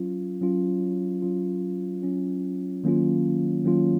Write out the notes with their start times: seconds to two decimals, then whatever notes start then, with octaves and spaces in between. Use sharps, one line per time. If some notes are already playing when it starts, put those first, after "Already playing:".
Already playing: F#3 C#4 F4
0.41 F#3 C#4 F4
1.22 F#3 C#4 F4
2.02 F#3 C#4 F4
2.84 D#3 F#3 A#3 C#4 F4
3.64 D#3 F#3 A#3 C#4 F4